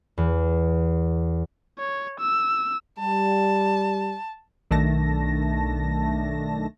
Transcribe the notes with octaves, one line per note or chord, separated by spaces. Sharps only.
E2
C#5
E6
G3 A5
B1 D#3 A3 D4 A5 A#6